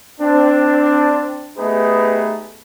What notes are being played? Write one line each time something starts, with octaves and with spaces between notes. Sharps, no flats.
C4 D4
A3 B3 D#4 G4 G#4 B4